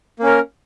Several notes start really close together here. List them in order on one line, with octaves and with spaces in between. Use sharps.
A#3 C#4 A#4